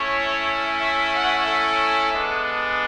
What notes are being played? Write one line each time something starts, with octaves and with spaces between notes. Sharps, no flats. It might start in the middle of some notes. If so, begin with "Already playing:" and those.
Already playing: A3 C#4 E4 C#5
E5
F#5
A4
G#3 B3 D4